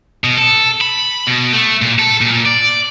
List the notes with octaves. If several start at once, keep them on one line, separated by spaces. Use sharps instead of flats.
B2
A4
B5
B2
A3
A#2
A4
A#2
D5